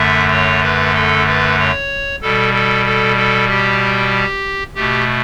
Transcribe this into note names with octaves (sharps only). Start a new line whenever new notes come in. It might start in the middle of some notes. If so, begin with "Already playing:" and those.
Already playing: F#2 D3 A3 E5
C#5
B4
A4
B4
C#5
B2 G3 A4
A4
A4
A4
G4
B2 A3 G4